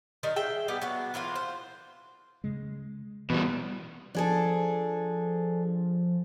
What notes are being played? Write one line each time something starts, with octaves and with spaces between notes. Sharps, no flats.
D#3 G3 A#4
G#4 E5 G5
G3 A#3 B3 G4
F#3 B3 D4
E3 A#3 D4 F4
C5
C#3 G#3
B2 E3 G3
F3 D4 G#4 A4